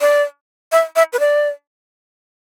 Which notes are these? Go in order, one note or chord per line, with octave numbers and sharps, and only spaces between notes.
D5
E5
E5
B4
D5